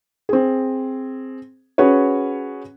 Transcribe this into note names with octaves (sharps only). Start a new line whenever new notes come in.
C4 G#4
C#4 F#4 G#4 B4 C#5